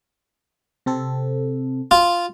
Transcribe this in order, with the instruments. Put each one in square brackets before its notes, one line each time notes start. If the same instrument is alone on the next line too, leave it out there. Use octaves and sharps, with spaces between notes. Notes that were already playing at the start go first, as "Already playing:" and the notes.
[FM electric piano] C3 C4 A4
[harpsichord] F4